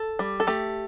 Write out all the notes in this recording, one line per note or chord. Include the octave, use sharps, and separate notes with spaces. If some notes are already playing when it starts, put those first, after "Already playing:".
Already playing: A4
G3
A4
A3 G4